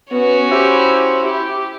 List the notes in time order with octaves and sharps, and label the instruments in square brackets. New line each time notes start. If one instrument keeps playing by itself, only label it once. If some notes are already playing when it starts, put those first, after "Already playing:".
[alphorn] B3 [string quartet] C#4 F#4 C#5
[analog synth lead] E4 [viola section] G4 [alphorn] C5
[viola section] G4